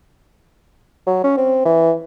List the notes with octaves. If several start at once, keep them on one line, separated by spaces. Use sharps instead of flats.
F#3
C#4
C4
E3